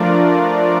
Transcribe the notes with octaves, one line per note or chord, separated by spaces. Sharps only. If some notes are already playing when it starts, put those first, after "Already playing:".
Already playing: F3 A3 D4 F4 A#4 D5